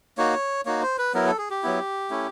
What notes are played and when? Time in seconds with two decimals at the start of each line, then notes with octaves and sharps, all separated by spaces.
0.18 A#3 D#4 F#4 C#5
0.66 A#3 D#4 F#4 C#5
0.82 C5
0.98 B4
1.14 F#3 B3 E4 A#4
1.26 A4
1.38 G#4
1.50 G4
1.63 F#3 B3 E4
2.10 A3 C#4 E4